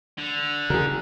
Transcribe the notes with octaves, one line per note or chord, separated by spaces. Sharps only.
D3
C#3 E3 G#4 A#4